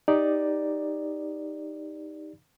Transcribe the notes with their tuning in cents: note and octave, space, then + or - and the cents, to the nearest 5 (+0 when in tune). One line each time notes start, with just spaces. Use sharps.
D#4 +0 G4 +10 D5 +0